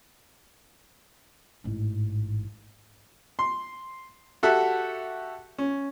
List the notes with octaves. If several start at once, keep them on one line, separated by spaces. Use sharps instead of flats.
A1 G#2
C6
F#4 G4 A4 E5 F#5
C#4